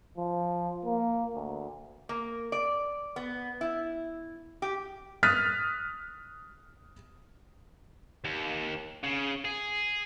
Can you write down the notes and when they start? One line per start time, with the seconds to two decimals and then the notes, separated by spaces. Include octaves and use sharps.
0.18 F3
0.85 A#3
1.35 D2
2.09 A#3
2.52 D5
3.16 B3
3.61 E4
4.62 G4
5.23 D#6 F6 F#6 A6 B6 D#7
8.25 D#2
9.03 C#3
9.45 G#4